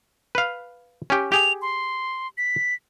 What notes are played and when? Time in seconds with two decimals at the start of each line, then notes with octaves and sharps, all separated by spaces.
0.35 B4 F5
1.10 C#4 G4
1.32 G4 G#4 G5 F7
1.62 C6
2.38 B6